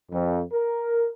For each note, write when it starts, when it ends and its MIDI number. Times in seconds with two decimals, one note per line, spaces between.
0.11 0.41 41
0.53 1.12 70